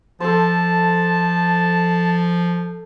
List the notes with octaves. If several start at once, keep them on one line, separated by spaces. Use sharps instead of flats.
F3 A4 C5 A5